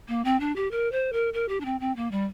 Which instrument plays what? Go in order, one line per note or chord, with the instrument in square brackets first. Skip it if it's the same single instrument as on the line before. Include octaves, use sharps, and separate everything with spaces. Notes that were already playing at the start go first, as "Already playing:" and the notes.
[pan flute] A#3
C4
D4
G4
A#4
C5
A#4
A#4
G4
D4
C4
C4
A#3
G3